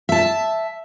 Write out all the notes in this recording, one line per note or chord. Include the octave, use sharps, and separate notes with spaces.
E5 A5